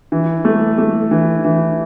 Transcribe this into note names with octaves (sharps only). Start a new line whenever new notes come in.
E3
A3
A3
E3
E3